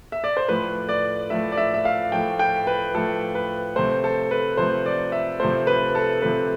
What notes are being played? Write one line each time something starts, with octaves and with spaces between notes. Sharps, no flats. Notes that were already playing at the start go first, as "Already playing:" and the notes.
E5
D5
C5
A2 F3 A3 B4
D5
A2 F3 A3 E5
D5
E5
E5
F5
A2 F3 A3 G5
G5
B4
A2 F3 A3 A4
B4
C3 F3 A3 C5
A4
B4
C3 F3 A3 C5
D5
E5
C3 F3 A3 C5
B4
A4
C3 F3 A3 B4